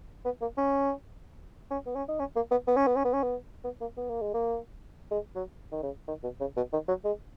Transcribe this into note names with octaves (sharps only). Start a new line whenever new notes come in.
B3
A#3
C#4
C#4
B3
C#4
D#4
C#4
A#3
B3
B3
C#4
B3
C#4
B3
C#4
B3
B3
A#3
B3
A#3
G#3
A#3
G#3
F#3
D#3
C#3
D#3
B2
C#3
B2
D#3
F#3
G#3